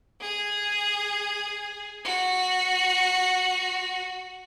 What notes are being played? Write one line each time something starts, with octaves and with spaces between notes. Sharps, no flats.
G#4
F#4